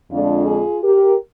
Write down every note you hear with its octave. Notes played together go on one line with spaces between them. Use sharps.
F2 D3 G#3 D4 F4
F4 G#4
G4 A#4